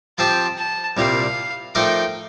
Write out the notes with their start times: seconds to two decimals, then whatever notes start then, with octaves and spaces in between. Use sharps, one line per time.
0.18 F3 C4 G4 A5
0.57 A5
0.97 C2 A#2 G3 F5
1.75 F3 A3 D#4 A#4 D5 G5